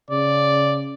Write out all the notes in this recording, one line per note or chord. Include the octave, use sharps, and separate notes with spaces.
C#3 D5